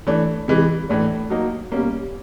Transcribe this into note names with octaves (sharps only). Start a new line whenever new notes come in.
E3 A3 D4
C3 E3 G#3
A2 E3 A3 D4
F#3 A#3 D#4
B2 G3 A#3 C#4